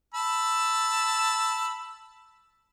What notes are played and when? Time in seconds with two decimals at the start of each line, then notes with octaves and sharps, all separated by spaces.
0.14 A5 B5 E6